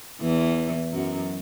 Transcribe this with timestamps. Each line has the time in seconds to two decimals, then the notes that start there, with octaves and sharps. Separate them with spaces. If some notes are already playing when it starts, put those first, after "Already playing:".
0.21 E2 E3
0.93 F#2 F#3